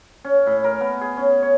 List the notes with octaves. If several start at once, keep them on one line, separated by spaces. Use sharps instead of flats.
C#4
A2
A#4
B3
G#4
C#4
C#5